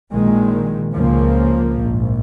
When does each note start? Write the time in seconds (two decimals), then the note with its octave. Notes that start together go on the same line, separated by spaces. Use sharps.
0.13 A#1 A#2 D#3 G#3
0.94 C#2 C#3 F3 A#3
1.76 A#1 G#2